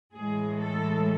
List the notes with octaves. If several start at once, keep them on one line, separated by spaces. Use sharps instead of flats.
A2 E3 G#3 G#4
A4